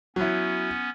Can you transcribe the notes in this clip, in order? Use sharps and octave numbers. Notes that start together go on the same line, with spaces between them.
F#3 B3 C#4 E4